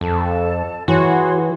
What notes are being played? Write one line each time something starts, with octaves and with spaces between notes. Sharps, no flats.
F2 A4 A5
E3 F#4 G#4 C#5 C6